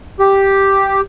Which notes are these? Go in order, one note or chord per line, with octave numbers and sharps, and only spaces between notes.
G4